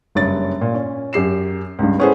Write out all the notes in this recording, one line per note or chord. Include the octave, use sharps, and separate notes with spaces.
F#1 G2 C#5 A6
A#2
C#4
F#2 G4 C7 E7
C#2 G2
B3 C#4 E4 G#4 A4 C5